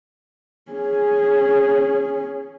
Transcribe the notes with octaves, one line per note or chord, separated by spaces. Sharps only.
C#4 G#4